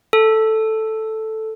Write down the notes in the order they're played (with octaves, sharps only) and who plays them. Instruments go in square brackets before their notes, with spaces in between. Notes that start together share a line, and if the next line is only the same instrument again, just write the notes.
[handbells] A4